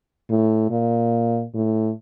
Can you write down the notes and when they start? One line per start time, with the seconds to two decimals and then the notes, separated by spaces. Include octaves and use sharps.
0.30 A2
0.70 A#2
1.54 A2